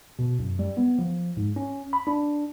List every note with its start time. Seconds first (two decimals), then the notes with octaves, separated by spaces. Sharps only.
0.19 B2
0.39 F#2
0.59 G3
0.77 B3
0.99 F3
1.37 G#2
1.56 C#4
1.93 B5
2.07 D4